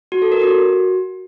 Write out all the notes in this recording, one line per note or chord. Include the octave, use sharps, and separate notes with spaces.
F#4
A4
A#4
F#4